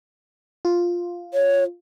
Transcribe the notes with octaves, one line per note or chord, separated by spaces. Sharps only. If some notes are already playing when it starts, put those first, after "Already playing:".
F4
C#5